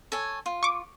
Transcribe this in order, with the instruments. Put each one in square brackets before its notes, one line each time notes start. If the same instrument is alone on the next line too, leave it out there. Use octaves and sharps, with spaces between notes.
[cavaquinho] A4 C#5 G#5
F4
[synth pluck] C#6 D6